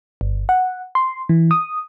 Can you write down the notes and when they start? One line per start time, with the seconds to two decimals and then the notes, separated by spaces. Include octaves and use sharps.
0.21 G1
0.49 F#5
0.95 C6
1.29 E3
1.51 D#6